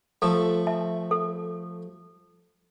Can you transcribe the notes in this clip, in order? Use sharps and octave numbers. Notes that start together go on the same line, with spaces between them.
F3 A3 A4
E5 A5
A4